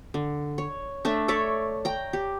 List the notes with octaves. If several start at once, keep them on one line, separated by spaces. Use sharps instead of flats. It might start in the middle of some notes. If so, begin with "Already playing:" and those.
D3
C#5
A3 D4 E5
A4 C#5 D5 E5
G5 A#5
G4